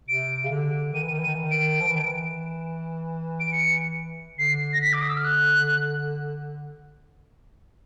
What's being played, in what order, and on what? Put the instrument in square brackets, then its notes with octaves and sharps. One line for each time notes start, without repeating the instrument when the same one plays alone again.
[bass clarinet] C3 [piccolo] D7
[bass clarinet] C#3
D3
[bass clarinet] D#3 [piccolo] D#7
[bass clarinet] E3
[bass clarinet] D#3 [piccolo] D#7
[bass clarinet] E3
[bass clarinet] D#3 [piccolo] D#7
[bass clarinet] E3
D#3
[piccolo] D7
[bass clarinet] F3
E3
D#3
E3
[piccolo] D7
C#7
[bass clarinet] D3 [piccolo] C7
[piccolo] A#6
B6
D6
D#6
E6
F6
F#6